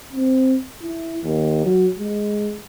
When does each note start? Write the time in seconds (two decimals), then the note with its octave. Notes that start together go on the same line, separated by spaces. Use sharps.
0.13 C4
0.83 E4
1.24 D#2
1.65 F#3
1.99 G#3